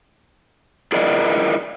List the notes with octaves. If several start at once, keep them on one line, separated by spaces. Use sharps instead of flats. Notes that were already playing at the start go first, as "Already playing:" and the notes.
E4 F4 G#4 A#4 D5 D#5